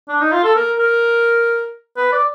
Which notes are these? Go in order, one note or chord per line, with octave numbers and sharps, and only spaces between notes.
D4
D#4
F4
A4
A#4
A#4
B4
D5